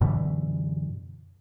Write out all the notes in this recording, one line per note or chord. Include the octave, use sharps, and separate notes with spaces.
F#2 B2 D3 E3